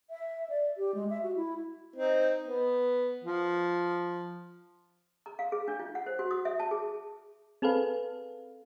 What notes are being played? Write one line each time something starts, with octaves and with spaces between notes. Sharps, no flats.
E5
D5
G4
G#3
E5
F#4
E4
C4 D#4
B3
F3
A#5
F5
G#4
D4
F4
F#5
C5
F#4
D#6
E5
A5
G#4
C4 G#4 A4 B4 F5